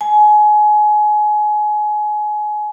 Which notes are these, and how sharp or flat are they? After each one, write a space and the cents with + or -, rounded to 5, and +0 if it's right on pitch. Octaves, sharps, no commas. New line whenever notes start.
G#5 +25